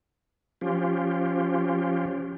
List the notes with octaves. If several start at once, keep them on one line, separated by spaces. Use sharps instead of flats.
F3 C#4 F4 G4